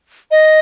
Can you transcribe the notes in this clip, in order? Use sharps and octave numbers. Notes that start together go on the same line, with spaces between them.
D#5